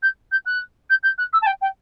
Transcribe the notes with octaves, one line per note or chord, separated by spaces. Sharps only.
G6
G6
F#6
G6
G6
F#6
E6
A5
G5
G5